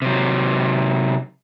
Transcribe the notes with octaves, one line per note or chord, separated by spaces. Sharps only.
C3 F#3